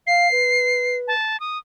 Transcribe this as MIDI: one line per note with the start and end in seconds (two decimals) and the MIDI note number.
0.07 0.30 77
0.07 0.96 96
0.31 1.14 71
1.08 1.39 81
1.40 1.58 87